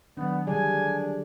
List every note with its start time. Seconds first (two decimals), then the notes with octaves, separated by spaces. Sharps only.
0.17 D#3 F#3 B3 D4
0.47 D3 G3 D4 G#4 G#5